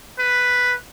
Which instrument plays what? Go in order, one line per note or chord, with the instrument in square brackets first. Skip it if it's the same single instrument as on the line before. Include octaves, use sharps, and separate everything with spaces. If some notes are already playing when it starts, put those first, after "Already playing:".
[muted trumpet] B4